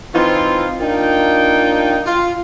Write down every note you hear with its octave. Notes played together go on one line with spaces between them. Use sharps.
E3 C4 D#4 F4
A#3 D4 D#4 F4 G5
F4